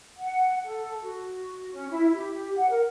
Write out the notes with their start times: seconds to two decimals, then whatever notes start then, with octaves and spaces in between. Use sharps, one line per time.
0.16 F#5
0.64 A4
1.01 F#4
1.71 C#4
1.91 E4
2.14 G4
2.56 F#5
2.70 A#4